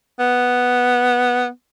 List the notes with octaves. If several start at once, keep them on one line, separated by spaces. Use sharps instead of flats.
B3